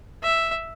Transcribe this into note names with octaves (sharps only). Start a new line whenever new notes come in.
E5